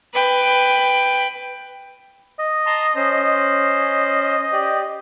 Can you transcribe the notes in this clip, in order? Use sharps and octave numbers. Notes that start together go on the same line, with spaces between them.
B4 G5
D#5
A5 A#5 C6
C#4 C5
D#5
G4 D5